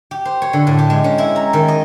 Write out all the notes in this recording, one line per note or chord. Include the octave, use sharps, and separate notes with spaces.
G4
C5
C#5
D3
A2
G4
G#3
C#4
E4
A#5
D#3
D#5